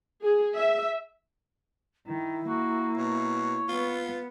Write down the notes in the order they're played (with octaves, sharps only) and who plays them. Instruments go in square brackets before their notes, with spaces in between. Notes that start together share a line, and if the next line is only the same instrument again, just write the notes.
[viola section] G#4
E5
[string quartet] D#3 [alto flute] E4
[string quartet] A#3 [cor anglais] F#4
[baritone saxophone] B2 [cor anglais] C#5
[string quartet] B3 [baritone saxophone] F4